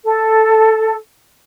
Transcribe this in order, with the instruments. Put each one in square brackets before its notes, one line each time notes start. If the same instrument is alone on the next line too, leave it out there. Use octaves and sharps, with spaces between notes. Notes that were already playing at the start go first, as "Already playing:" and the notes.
[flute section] A4